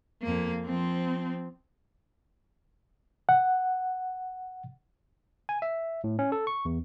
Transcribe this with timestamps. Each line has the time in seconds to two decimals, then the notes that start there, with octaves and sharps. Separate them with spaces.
0.22 F2 A#3
0.66 F3 C4
3.29 F#5
5.49 G#5
5.62 E5
6.04 A2
6.19 C#4
6.32 A4
6.47 C#6
6.65 E2